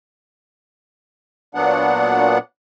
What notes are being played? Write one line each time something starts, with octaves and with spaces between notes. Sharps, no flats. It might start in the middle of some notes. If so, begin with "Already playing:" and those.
A#2 F#3 B3 D4 F#5